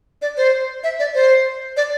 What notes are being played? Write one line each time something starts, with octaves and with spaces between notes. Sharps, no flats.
D5
C5
E5
D5
C5
D5